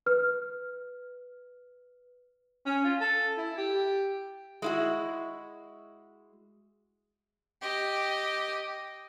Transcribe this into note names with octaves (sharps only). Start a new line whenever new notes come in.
B4 F6
C#4
F4
A4
E4
G4
G#3 E4 F#4
G4 D#5